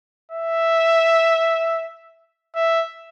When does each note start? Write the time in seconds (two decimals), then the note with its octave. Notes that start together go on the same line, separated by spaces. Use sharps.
0.31 E5
2.55 E5